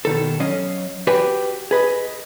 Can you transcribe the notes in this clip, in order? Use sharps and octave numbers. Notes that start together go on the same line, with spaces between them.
B2 D#3 A4
F#3 C#4 D#5 F5
F#4 G4 B4 D5 G5 G#5
G#4 B4 D#5